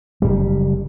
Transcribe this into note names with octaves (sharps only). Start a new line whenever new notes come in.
F#1 D#2 G3